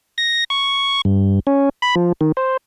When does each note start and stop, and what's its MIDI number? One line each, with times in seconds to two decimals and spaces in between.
0.18 0.44 94
0.50 1.01 85
1.05 1.40 43
1.47 1.69 61
1.82 1.95 83
1.96 2.12 53
2.21 2.32 51
2.37 2.57 72